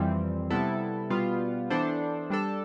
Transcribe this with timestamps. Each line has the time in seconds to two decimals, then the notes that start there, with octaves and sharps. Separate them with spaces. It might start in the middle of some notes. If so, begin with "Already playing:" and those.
Already playing: F2 E3 G3 C4
0.50 C3 G3 B3 E4 A4
1.10 B2 G3 B3 F4
1.70 E3 B3 D4 A4 C5
2.30 G3 D4 A4